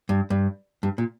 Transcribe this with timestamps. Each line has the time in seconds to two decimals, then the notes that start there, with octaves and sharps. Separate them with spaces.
0.09 G2
0.30 G2
0.83 G2
0.98 A#2